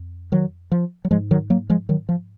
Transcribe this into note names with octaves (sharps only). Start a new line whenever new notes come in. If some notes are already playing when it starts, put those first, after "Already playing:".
Already playing: F2
D#3 F#3
F3
F#3
G#2 F3 G#3
D#3 F#3
F#3 A#3
F3 G#3
D#3 F#3
F3